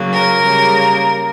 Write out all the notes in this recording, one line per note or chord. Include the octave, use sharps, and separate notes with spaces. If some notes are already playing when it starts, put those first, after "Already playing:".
Already playing: C#3 F#3 A#3
A#4
C#3 G3 A#3